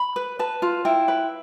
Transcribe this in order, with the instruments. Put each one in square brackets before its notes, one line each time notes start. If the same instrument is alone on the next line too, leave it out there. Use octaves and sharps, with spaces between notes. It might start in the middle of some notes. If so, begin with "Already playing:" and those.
Already playing: [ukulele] B5
B4
B4 A5
F4
E4 G5
B4